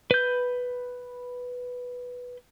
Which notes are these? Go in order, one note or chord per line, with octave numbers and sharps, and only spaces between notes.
B4 G6